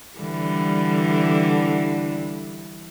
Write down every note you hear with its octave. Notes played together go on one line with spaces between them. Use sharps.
D3 E3 G3